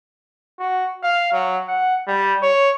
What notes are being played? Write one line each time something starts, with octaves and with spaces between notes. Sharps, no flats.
F#4
F5
F#3
F#5
G3
C#5